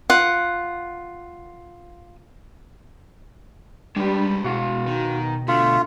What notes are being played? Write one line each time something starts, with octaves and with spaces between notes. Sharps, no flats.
F4 F#5
G3 G#3 D4 G4 B4
B2 F#4 F5 F#5
D#3
D3 A3 F4